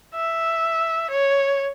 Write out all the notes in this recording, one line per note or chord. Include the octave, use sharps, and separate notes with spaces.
E5
C#5